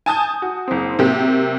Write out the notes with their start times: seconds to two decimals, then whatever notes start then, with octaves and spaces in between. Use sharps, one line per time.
0.06 G#5 A5 D#6 G6
0.42 F#4
0.68 F#1 C4
0.99 C3 F#3 A#3 G4